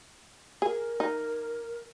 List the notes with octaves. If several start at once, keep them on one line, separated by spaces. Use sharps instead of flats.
G#4 A#4
D#4